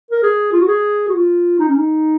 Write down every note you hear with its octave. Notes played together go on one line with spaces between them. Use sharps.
A#4
G#4
F4
F#4
G#4
F#4
F4
D#4
C#4
D#4